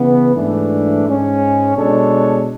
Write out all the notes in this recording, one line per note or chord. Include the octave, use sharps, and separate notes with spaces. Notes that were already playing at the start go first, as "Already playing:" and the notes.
Already playing: C#3 E3 B3
G#2 E3 A3 D4
G#2 G#3 C#4
B2 G#3 D4 A4 C#5